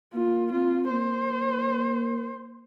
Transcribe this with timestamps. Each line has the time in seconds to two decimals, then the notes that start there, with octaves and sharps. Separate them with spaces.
0.14 A#3 F4
0.52 C4 F4
0.90 A#3 C5